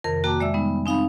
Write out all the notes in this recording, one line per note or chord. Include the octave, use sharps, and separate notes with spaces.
F2 C3 D#3 A#4
A#3 F#4 G5 A5 D6
G#3 D5 E5 E6
G3 G#3 B3 D#4
C4 D#4 F5 G#5 B5